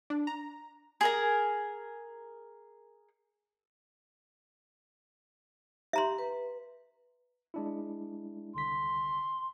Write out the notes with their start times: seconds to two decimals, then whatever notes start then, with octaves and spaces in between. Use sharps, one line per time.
0.10 D4
0.27 A#5
1.01 G#4 A#4 A#5
5.93 G4 E5 A#5 C6
6.18 B4
7.54 G#3 D4 E4
8.55 C2 D3 C6 B6